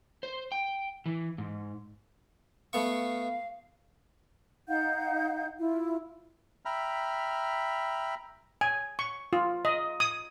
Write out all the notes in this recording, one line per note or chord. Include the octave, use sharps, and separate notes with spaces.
C5
G5
E3
G#2
A3 B3 F5 C#6
D#4 F5 F#5 G6
E4 F4
E5 G5 A#5 B5 F6
G#5
C#6
F4
D#5
D#6